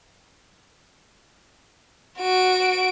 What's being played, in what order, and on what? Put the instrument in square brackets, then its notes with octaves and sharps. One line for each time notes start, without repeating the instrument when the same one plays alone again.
[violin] F#4 D7